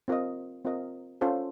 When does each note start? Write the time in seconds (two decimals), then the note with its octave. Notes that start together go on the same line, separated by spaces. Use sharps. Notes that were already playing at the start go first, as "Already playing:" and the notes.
0.08 C4 F4 A#4 D#5
0.65 C4 F4 A#4 D#5
1.21 C#4 F4 A4 C5